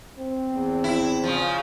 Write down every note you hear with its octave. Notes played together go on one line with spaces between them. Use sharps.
C4
E2
E4
C#3 F3